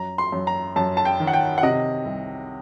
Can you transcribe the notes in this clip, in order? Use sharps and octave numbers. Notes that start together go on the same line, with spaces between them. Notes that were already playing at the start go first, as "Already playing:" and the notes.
Already playing: F#2 A#5
C6
F#2
A#5
F#2 A5
A5
G5
D#3
F#5
G5
F#5
C3 D#5
C2